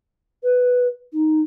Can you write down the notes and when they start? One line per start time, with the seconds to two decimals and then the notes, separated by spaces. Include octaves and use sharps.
0.43 B4
1.13 D#4